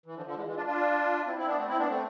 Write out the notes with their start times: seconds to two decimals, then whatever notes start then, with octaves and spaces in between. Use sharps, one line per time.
0.06 E3
0.15 D3 F3
0.26 D3 F3
0.36 E3 G#3
0.46 E3 G#3
0.56 D4 F4
0.66 D4 F4
1.27 C4 E4
1.37 C4 E4
1.47 B3 D4
1.57 A3 C4
1.68 C4 E4
1.78 B3 D4
1.88 A3 C4